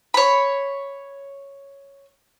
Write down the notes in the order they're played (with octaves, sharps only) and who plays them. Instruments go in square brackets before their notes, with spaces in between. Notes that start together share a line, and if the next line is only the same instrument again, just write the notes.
[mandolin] C#5 B5